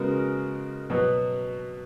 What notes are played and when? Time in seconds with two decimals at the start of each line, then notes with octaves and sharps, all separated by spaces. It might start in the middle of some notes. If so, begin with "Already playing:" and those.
Already playing: C#3 G#3 B3 F#4 A#4
0.90 B2 F#3 B3 F#4